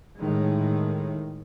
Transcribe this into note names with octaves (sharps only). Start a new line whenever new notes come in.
A2 D#3 G#3